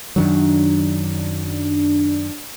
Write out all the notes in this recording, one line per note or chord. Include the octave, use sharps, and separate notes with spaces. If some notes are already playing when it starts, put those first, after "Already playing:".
F#2 D#3 F#3 D4